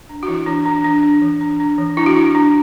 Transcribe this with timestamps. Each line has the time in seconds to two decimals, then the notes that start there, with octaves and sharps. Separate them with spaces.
0.09 D4
0.23 F#4
0.28 E3 E4
0.46 E3 D4
0.66 D4
0.84 E3 D4
1.03 D4
1.22 E3
1.41 D4
1.60 D4
1.78 E3
1.97 D4 E4
2.06 F#4
2.16 D4 E4
2.35 D4